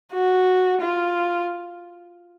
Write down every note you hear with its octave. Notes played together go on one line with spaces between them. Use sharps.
F#4
F4